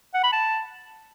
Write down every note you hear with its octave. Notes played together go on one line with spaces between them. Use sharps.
F#5
B5
A5